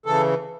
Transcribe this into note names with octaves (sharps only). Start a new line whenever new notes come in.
C#3 E3 A4